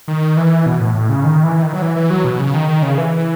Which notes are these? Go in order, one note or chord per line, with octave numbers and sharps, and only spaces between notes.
D#3
E3
B2
A2
A2
C#3
D#3
E3
D#3
F#3
E3
E3
F#3
B2
C#3
D#3
D#3
C#3
E3